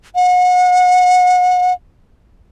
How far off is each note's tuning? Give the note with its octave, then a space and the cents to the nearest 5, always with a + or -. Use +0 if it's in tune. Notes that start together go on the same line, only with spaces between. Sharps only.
F#5 -35